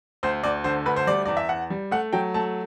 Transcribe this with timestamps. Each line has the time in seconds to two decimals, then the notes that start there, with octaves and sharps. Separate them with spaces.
0.23 D2 C5
0.43 D2 D5
0.64 D3 C5
0.86 D2 B4
0.96 C5
1.07 G3 D5
1.25 E2 D5
1.37 E5
1.49 E2 F#5
1.70 G3
1.91 A3 F#5
2.13 F#3 G5
2.34 A3 A5